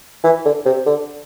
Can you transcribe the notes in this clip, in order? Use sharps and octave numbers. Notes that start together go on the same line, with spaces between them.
E3
D3
C3
D3